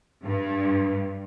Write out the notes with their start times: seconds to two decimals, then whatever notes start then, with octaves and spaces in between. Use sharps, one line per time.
0.25 G2